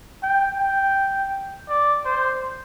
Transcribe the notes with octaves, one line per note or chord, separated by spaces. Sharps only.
G5
G5
D5
C5